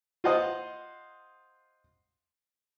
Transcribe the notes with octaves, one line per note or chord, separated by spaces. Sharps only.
F4 C5 D#5 F#5 D#6